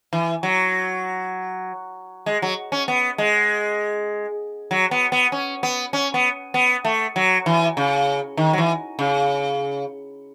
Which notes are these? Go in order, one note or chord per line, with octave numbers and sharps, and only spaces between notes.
E3
F#3
G#3
F#3
C#4
B3
G#3
F#3
B3
B3
C#4
B3
C#4
B3
B3
A3
F#3
E3
C#3
D#3
F#3
E3
C#3